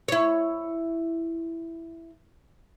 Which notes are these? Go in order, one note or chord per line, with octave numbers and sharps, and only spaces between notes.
E4 C#5